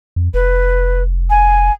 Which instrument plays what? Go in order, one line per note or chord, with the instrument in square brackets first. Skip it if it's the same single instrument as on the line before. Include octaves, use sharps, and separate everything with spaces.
[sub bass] F2
[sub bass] F1 [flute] B4
[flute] G#5